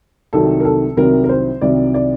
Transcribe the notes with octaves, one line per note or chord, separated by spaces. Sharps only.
C2 C3 D#3 F#3 A4
A#4
A4
C2 C3 D#3 F#3 A#4
A#4
C5
C2 C3 D#3 F#3 D5
D5